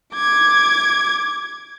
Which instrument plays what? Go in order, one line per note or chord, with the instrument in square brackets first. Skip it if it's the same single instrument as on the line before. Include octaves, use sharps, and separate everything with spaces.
[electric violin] D6 G#6